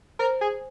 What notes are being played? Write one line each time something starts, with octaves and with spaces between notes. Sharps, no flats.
A#4 C5
G#4